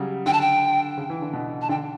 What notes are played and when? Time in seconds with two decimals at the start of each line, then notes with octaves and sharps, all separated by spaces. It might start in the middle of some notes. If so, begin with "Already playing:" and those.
Already playing: C#3 F#3 G3
0.26 D3 G5
0.33 A5
0.41 G5
0.98 C#3
1.10 E3
1.22 D3
1.33 B2
1.62 A5
1.69 D3 G5